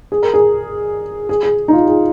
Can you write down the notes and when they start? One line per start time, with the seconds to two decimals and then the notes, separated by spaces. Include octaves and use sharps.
0.12 G#4
0.23 A#4
0.34 G#4
1.29 G#4
1.43 G#4
1.68 D#4
1.73 F4
1.87 G#4